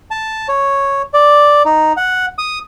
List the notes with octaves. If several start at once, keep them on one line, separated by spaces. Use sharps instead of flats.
A5
C#5
D5
D#4
F#5
D#6